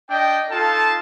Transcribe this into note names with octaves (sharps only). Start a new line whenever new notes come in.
D4 D#5 G5
D#4 F4 A4 A5